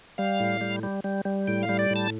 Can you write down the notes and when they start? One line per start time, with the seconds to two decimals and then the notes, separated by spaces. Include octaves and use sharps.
0.18 G3 F5
0.40 A2
0.61 G3
0.83 G3
1.04 G3
1.25 G3
1.47 A2 G5
1.63 F5
1.69 G3
1.79 D5
1.90 A2
1.96 A5